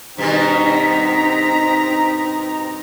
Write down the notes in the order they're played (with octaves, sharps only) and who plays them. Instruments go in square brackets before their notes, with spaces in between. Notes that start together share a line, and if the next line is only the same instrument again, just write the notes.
[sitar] G2 B2 D#3 [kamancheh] C4 A#5 [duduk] D#4 [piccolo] B6